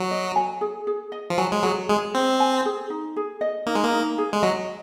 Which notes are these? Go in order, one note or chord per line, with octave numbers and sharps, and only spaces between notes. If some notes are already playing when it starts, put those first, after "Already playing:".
Already playing: F#3
D#5
G#5
G#4
G#4
D#5
F3
F#3 G#5
G#3
F#3 G#4
G#3 G#4
C4 D#5
G#5
G#4
D#4
G#4
D#5
A#3 D#4
G#3
A#3
D#4
G#4
G#3
F#3 D#5